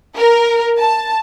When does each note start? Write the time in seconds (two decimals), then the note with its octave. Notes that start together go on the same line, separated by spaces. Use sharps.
0.17 A#4
0.78 A5